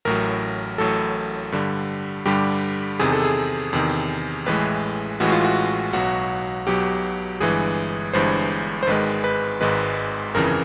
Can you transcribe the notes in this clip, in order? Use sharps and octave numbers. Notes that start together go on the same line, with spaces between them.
A1 A2 F#3 A#4
A1 A2 F#3 A4
G2 D3 G3
G2 D3 G3 G4
E2 C3 D#3 G#4
A4
G#4
E2 C3 D#3
A1 A2 E3 G#3 B4
A1 A2 E3 G#3 F#4
F4
F#4
B1 B2 F#3 F#4
B1 B2 F#3 G4
G1 G2 E3 G#3 G#4
G1 G2 E3 G#3 C5
C5
G#1 G#2 D#3 G#3 B4
B4
G#1 G#2 D#3 G#3 B4
G1 F2 C#3 E3 A#4